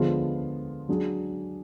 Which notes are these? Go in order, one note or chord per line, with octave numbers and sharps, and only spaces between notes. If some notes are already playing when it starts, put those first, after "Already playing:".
Already playing: D3 F3 G#3 B3 F4
F#3 D4 G#4